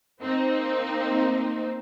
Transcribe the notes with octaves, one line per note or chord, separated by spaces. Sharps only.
A#3 C4 D#4